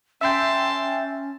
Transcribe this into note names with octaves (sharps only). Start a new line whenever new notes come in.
C#4 E5 G5 A5 C6